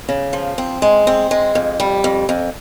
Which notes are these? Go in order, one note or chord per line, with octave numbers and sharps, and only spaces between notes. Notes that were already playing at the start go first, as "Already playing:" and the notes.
C#3
F3
C4
G#3
C4
G#3
F2
G3
F2
F2